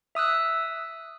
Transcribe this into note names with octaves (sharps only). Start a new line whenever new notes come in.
E5 D#6 E6 F#6